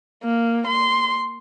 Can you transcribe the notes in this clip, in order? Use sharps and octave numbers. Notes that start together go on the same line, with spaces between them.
A#3
C6